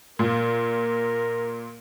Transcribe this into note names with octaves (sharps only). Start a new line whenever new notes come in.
A#2 A#4